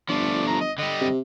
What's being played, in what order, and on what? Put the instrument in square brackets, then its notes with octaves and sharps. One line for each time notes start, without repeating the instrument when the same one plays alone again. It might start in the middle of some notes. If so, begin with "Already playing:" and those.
[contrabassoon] G1 [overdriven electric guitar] F3 A3 [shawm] D5
[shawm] A#5
D#5
[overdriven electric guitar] D3 G3 [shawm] D#5
[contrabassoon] C3